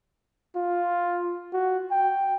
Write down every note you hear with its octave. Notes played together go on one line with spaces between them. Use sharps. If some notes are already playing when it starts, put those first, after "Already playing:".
F4
F#4
G5